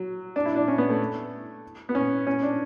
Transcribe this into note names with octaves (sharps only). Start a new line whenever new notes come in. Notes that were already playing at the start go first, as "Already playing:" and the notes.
Already playing: F#3
D4
E4
D4
C#4
B3
A3
B3
C#4
C#4
D4